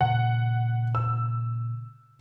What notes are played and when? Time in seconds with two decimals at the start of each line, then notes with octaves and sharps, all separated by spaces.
0.01 A#2 C#3 F#5
0.95 E6